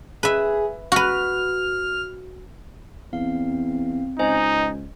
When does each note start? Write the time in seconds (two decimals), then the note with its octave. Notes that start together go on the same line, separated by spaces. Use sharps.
0.23 G#4 B4 E5
0.92 F#4 B4 F6
3.13 E2 C4 F5
4.19 C#2 D#4 C5 D#5 G#5